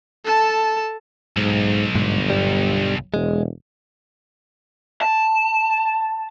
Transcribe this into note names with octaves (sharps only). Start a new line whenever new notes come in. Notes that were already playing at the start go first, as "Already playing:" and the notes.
A4 A5
B1 G#2
G1 G#2
G2 G3
E1 G#3
A5